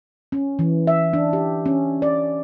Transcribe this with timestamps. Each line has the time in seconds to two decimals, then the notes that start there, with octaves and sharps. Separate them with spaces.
0.32 C#4
0.59 E3
0.87 E5
1.13 D4
1.33 G4
1.66 C#4
2.02 D5